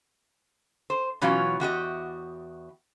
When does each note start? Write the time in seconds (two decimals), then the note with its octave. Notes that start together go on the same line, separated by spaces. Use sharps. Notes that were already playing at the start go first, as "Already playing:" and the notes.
0.90 C5
1.21 B2 E3 F#3 C#4 F4 F#4
1.60 E2 F#4 G4 D#5